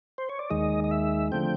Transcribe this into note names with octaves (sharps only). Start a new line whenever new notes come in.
C5
C#5
D5
D#2 D#3 G#3 D#5
D#5
E5
D3 F3 A3 C4 G5